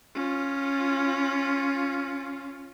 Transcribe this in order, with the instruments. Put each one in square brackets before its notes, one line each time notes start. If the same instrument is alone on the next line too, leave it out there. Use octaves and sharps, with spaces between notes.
[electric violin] C#4 F4